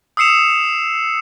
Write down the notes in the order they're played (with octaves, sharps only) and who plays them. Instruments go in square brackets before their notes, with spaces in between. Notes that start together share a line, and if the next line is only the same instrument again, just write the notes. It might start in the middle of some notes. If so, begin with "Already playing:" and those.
[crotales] D#6 E6 C7 C#7 E7 F7